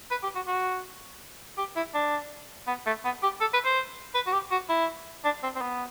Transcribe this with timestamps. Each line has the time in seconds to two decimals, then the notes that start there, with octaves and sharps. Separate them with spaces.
0.11 B4
0.23 G4
0.35 F#4
0.47 F#4
1.58 G4
1.76 E4
1.95 D4
2.67 B3
2.86 A3
3.05 B3
3.23 G4
3.41 A4
3.53 B4
3.65 C5
4.15 B4
4.27 F#4
4.33 G4
4.51 F#4
4.69 E4
5.25 D4
5.43 C4
5.56 C4
5.61 B3